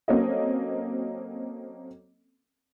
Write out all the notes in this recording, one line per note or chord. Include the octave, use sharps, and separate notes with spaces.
F#3 A#3 C4 C#4 A4 D#5